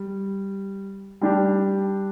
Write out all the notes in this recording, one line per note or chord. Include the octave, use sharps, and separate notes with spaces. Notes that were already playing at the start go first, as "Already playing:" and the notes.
Already playing: G3
G3 D4 G4